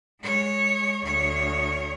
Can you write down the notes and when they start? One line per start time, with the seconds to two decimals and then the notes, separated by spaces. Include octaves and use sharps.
0.20 G#3 C#5
1.03 D2 C#5